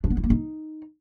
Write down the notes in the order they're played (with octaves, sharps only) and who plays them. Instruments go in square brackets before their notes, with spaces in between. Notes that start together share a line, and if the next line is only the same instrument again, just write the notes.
[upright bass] D4
B3
E4
A#3
D#4